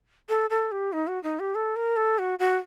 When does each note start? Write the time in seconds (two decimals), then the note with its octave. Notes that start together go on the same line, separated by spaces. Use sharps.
0.29 A4
0.50 A4
0.72 G4
0.93 D#4
1.07 F#4
1.23 D#4
1.40 G4
1.55 A4
1.76 A#4
1.96 A4
2.19 F#4
2.39 F#4